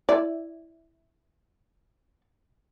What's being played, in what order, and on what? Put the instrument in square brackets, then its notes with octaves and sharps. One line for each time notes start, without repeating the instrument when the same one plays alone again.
[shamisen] E4 D5